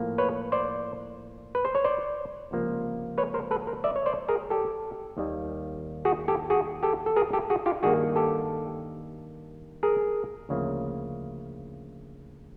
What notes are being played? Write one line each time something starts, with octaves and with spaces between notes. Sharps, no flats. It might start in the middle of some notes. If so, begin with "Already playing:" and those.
Already playing: A2 F3 A#3
B4 C#5
C5 D5
B4
C5
C#5
C5 D5
C#2 C3 F3 A#3
B4 C#5
A#4 C5
A4 B4
A#4 C5
D5 E5
C#5
C5 D5
G#4 A#4
G4 A4
D#2 D#3 G3 A#3
F#4 G#4
G4 A4
F#4 G#4
G4 A4
A4
G#4 A#4
G4 A4
F#4 G#4
F4 G4
G2 D#3 G3 A#3 F#4 G#4
G4 A4
G#4 A#4
D2 C#3 F3 A#3